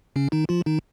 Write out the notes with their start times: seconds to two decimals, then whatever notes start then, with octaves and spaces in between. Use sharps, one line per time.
0.16 C#3 C#4
0.32 D#3 D#4
0.49 F3 F4
0.66 D#3 D#4